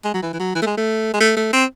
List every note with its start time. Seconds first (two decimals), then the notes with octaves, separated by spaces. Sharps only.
0.05 G#3
0.14 F#3
0.22 E3
0.33 E3
0.40 F#3
0.55 E3
0.62 A3
0.66 G#3
0.77 A3
1.14 G#3
1.20 A3
1.37 A3
1.53 C4